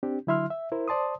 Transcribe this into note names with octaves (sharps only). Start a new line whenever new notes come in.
C4 D4 G4
D3 F#3 E4 E5 C6 F6
E5
E4 A#4 C5
C5 D5 A5 C6 D#6